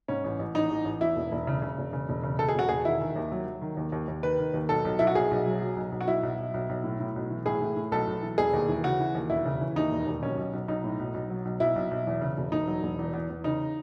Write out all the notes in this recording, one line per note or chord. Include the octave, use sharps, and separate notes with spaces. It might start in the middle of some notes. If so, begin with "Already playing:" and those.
G#2 C#4
A1
A1
A1 D#4
A1
A1
E2 E4
E1
E1
C#3
C#3
E1
C#3
E1
C#3
C#3 A4
G#4
E1 F#4
E1 G#4
D#3 E4
D#3
D#2
F#3
F#3
D#3
D#2
D#2
D#2
D#3 B4
D#3
D#2
B1 A4
B1
B1 E4
F#4
B1 G#4
B1
F#3
F#3
B1
B1
F#4
B1 E4
B1
B1
B1
B1
A2
A2
B1
E3
A2 G#4
A2
A2
B1 A4
B1
E3
E1 G#4
D#2
E3
C#3 F#4
E3
D#2
E1 E4
C#3
E3
D#2 D#4
E1
D#2
B1 C#4
B1
B1
B1 D#4
A2
B1
B1
F#3
B1
B1 E4
B1
B1
E2
C#3
E1
E1 D#4
F#3
E1
E2
E2
E2
C#3 D#4